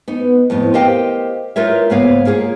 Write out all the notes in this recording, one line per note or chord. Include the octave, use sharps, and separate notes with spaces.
B3 D#4
F2 A2 B3
G4 A#4 C5 D#5 F5 G5
D#4 F4 A#4 C#5 E5
G#2 C#3 A#3 B3 C#5 F5
A#3 F4 G#4 C#5